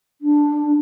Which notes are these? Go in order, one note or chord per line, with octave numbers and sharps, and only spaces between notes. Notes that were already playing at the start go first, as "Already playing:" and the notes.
D4